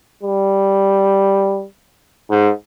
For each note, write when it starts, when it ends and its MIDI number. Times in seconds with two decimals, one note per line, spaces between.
0.23 1.65 55
2.30 2.51 44